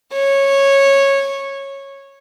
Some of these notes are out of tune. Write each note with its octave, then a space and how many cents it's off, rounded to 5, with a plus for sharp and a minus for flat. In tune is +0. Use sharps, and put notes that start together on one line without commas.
C#5 -10